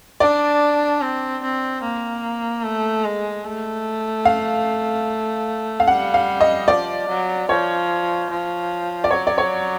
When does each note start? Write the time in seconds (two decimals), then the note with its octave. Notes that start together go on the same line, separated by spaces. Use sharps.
0.20 D4 D5
1.01 C4
1.42 C4
1.82 A#3
2.64 A3
3.04 G#3
3.45 A3
4.25 F5
5.80 F5
5.87 G3 F#5
6.14 F5
6.41 D#5
6.68 F3 D5
7.09 F#3
7.49 F3 C#5
8.30 F3
9.04 D5
9.11 F#3 C#5
9.27 D5
9.38 C#5